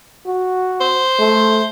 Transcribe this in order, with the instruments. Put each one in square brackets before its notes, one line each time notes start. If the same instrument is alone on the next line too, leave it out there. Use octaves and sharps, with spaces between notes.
[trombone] F#4
[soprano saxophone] C5
[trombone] A3